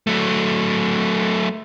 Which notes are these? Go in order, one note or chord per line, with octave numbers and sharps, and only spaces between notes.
F#3 A3